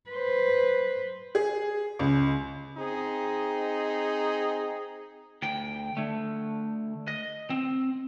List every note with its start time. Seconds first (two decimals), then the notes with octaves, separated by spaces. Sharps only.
0.10 B4 C5
1.35 G#4
1.99 C#2
2.77 C4 D#4 G#4
5.42 D2 G5
5.97 D3 A3
7.08 D#5
7.50 C4